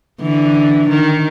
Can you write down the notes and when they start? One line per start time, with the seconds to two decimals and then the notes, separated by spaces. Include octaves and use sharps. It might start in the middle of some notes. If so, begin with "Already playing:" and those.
0.21 D3 E3
0.89 D#3